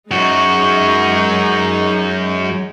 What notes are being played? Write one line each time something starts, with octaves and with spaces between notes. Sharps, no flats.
F#2 G#3 D#4 F#4